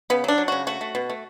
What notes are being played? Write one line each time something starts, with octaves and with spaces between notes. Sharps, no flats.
C#3 B3
F#3 D4
F#3
C#3 F#4
A3 F#4
A3
B2
A3